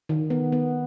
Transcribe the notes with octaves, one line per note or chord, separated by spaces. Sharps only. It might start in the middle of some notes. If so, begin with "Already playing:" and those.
D#3
B3
B3